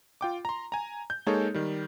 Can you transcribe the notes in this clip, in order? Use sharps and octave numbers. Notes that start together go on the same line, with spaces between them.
F4 G5 D6
A#5 C6
G#5 A#5
G6
G#3 A#3 D#4 G#4 A4 C#5
D#3 G3